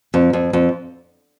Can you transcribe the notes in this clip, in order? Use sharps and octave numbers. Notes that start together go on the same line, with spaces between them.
F2
F2
F2